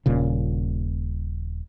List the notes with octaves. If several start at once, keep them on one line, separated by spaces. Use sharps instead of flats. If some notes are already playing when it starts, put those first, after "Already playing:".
D#1 A#2 C#3